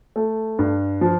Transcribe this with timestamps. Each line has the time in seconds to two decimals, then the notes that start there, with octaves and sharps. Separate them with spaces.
0.16 A3
0.59 G2
1.01 F3